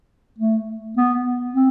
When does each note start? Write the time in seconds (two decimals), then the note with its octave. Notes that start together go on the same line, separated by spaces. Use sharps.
0.39 A3
0.97 B3
1.53 C4